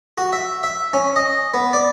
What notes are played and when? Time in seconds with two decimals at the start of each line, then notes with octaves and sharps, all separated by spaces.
0.18 F#4
0.33 E5
0.63 E5
0.93 C#4
1.16 D#5
1.54 B3
1.73 D5